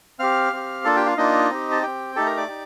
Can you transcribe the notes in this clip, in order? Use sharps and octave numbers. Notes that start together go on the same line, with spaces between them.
C4 G4 F5 F6
C4 G4
A#3 D4 F4 A4 A5
G4 G5
F4 F5
A#3 D4 D#4 F4 D#5
C4 G4
A5
C4 G4 G5
A3 D#4 G4 A4 A5
A#4 A#5
D5 D6
D#4 G4